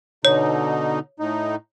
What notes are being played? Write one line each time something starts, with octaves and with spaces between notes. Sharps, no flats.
B2 D3 D#4 C#5
A2 D#4